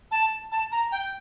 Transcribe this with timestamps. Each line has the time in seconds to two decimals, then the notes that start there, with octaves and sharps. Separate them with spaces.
0.11 A5
0.52 A5
0.72 A#5
0.92 G5